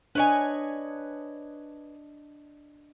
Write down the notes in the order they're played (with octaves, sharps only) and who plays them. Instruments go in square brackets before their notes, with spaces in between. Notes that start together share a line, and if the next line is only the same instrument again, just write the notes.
[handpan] D4 D#5 [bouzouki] B4 C#5 G#5